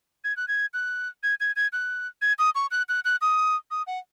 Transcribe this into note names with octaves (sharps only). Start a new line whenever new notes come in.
G#6
F#6
G#6
F#6
G#6
G#6
G#6
F#6
G#6
D#6
C#6
F#6
F#6
F#6
D#6
D#6
F#5